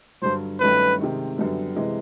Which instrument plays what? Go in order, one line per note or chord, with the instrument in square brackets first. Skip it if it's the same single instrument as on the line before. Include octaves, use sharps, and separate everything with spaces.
[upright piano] G2 D3 F#3 [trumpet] C5
[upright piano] G2 D#3 F#3 A3 C#4 [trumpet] B4
[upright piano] C3 D#3 G#3
F#2 D3 G3 B3
C3 E3 G#3